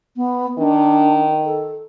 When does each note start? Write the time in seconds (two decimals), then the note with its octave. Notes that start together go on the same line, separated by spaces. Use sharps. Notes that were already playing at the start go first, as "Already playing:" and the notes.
0.16 B3
0.58 D#3 D4
1.45 A4